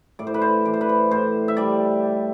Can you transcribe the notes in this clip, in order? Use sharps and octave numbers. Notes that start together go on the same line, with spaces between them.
A2 D5
C5
B4
C5
E3 D5
C5
B4
C5
A2 C5
E5
G3 D5